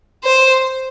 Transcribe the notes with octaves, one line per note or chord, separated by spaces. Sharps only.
C5